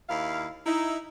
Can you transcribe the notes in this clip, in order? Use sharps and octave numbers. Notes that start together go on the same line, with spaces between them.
D#2 E4 F5
D#4 E4